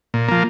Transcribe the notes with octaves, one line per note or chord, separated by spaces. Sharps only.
A#2
F3 A#3